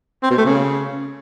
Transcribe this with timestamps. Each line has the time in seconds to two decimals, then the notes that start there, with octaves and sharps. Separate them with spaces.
0.23 C4
0.30 B2
0.38 A3
0.45 C#3